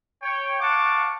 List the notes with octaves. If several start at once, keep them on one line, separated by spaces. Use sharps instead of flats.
C#5 G5
F5 F#5 A5 C#6 D6